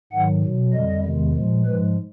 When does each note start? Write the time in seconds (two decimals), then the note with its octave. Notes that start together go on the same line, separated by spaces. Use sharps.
0.12 G#2 D#3 F#3 F#5
0.43 B2 F#3
0.73 F2 D3 G3 D#5
1.04 E2 C3 D#3 G#3
1.35 A#2 F3 G#3
1.66 G#2 F3 G#3 B4